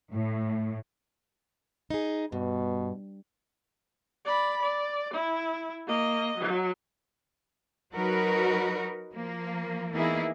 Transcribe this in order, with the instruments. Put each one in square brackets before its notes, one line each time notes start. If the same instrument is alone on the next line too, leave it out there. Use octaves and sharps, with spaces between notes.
[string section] A2
[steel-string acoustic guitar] D#4 G#4
[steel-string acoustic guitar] G2 [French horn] B2
[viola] D5 B5
D5
E4
A#3 D#5
F#3
[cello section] F#3 D#4 F#4 A#4 B4
F3 A#3
E3 A#3 B3 D#4 E4 G#4